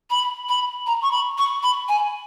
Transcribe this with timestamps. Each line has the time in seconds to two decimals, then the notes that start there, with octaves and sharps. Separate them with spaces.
0.10 B5
0.49 B5
0.87 A#5
1.02 C#6
1.12 B5
1.38 C#6
1.63 B5
1.89 G#5